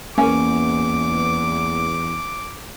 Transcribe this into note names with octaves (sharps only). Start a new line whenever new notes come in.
E2 A#3 C#4 D6